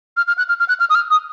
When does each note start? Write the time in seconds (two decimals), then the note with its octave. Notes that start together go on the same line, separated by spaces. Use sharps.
0.17 F6
0.27 F6
0.38 F#6
0.49 F6
0.59 F6
0.69 F#6
0.80 F6
0.90 D#6
0.95 F6
1.11 D#6